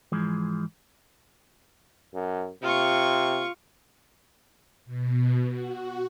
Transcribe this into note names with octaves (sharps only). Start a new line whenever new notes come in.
G#2 E3 F3 G#3
F#2
C3 F4 C#6
B2
F#4